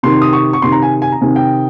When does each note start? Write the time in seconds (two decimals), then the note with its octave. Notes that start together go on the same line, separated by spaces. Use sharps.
0.03 C3 D#3 C6
0.22 D#6
0.33 C#6
0.53 C#6
0.62 C3 D#3 C6
0.72 A#5
0.82 G#5
1.02 G#5
1.12 A#5
1.21 C3 D#3 G#5
1.36 G5